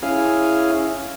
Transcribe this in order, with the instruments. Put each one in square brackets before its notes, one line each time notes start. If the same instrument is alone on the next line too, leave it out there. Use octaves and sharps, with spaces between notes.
[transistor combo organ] C#4 E4 G#4 F5